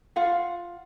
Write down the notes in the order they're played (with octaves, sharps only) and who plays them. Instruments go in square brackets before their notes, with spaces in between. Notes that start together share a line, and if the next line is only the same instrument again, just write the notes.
[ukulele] F4 F5 F#5